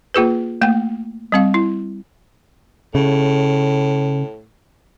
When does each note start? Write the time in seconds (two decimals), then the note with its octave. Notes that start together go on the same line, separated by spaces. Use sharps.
0.14 A#3 F4 G#4 B4
0.61 A3 A#3 G5
1.32 G3 C4 F5
1.54 E4
2.95 A2 C#3